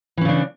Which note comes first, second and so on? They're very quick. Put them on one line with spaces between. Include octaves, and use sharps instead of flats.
E3 C#4 C#3 D4